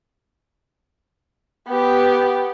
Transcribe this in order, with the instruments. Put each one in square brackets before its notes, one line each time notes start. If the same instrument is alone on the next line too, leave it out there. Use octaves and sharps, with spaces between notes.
[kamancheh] B3 G4